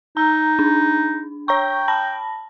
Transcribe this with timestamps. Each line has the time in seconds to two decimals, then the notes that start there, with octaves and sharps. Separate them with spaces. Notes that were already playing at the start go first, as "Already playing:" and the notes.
0.17 D#4 A#5
0.59 D4
1.48 C#5 G5 A#5 C#6
1.88 A5 B5 A#6